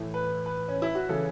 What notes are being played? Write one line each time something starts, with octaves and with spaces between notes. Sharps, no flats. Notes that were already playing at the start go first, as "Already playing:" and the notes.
Already playing: A2 E3 A3
B4
B4
C#4
E4
F#4
C#3 E3 A4